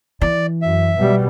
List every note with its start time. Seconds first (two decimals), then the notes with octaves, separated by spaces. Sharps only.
0.21 E3 D5
0.62 F#2 E5
0.96 B2 G3